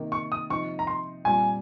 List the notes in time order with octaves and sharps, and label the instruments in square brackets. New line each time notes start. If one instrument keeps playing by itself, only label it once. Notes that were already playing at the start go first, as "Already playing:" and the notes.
Already playing: [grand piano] C3 D#3 A#3 D#4
[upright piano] C#6
D#6
[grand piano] C3 F3 C4 D#4 [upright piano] C#6
[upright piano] A#5
C6
[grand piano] A#2 G3 C4 F4 [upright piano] G#5